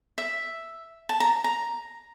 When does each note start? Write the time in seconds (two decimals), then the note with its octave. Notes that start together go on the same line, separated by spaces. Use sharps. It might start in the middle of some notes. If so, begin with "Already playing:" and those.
0.18 E5
1.09 A5
1.20 A#5
1.44 A#5